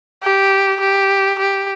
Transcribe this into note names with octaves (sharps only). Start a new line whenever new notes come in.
G4
G4
G4